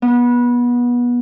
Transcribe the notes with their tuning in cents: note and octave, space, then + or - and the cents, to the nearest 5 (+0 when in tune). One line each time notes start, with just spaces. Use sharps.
B3 -25